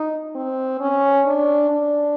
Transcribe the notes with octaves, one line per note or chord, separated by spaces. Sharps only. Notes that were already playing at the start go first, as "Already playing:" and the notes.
Already playing: D#4
C4
C#4
D4
D4